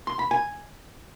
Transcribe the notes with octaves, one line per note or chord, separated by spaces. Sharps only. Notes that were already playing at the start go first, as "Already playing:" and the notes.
C6
B5
G#5